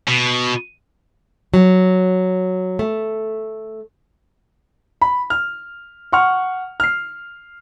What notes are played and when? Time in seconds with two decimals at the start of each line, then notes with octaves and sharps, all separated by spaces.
0.07 B2
1.54 F#3
2.79 A3
5.02 B5
5.30 F6
6.12 F#5 C#6 F6
6.80 F6 C7